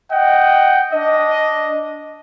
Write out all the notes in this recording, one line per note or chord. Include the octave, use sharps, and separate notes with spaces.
D#5 F#5 G5
D4 D#5